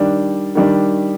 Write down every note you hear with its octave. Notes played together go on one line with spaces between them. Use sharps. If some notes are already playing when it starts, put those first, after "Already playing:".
Already playing: D#3 G3 D4
D#3 G3 D4